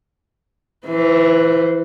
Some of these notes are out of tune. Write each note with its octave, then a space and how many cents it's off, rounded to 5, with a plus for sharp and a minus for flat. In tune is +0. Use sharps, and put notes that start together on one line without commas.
E3 +0 C5 -30